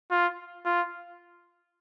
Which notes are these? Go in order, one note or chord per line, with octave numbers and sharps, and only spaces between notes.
F4
F4